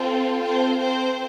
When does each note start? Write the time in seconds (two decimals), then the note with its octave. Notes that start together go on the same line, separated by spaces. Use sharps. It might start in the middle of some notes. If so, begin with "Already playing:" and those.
Already playing: C4 F4 A4 C5
0.42 C4 C5
0.81 C4 C5